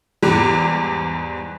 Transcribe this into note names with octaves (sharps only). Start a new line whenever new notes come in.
E2 G#2 G3